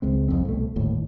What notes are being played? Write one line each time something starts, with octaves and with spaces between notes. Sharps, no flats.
C#2 G#3 C4
C2 F2 C4
C2 B2 A3
G1 D#2 A2